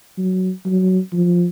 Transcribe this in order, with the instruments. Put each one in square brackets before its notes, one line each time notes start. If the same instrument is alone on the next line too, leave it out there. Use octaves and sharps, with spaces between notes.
[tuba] F#3
F#3
F3